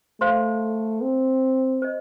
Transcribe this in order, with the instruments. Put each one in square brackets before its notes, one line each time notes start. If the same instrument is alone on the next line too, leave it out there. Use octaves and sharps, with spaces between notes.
[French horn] A3 [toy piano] C5 F5 C6
[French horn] C4
[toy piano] C5 D#5